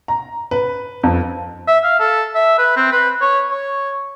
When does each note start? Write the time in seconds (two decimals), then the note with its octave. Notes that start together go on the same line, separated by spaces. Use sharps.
0.08 A#5
0.51 B4
1.03 F2
1.68 E5
1.84 F5
2.00 A4
2.35 E5
2.58 B4
2.76 C4
2.92 B4
3.21 C#5
3.51 C#5